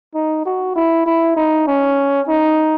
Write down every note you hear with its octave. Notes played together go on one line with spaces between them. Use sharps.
D#4
F#4
E4
E4
D#4
C#4
D#4